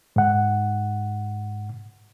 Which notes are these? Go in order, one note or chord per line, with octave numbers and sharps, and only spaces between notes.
G#2 F#5